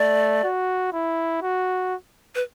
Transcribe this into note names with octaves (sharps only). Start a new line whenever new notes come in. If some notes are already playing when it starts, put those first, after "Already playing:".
Already playing: A3 D5
F#4
E4
F#4
B4